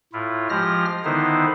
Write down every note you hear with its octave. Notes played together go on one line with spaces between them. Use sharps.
A2 E4 F4
F3 G#3 F4 G4 F6 A#6
D3 D#3 B3 D#4 E4 C5